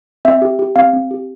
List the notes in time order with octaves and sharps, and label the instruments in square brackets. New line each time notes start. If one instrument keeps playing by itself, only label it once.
[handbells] C4 E5
G4
G4
C4 F5
C4
G4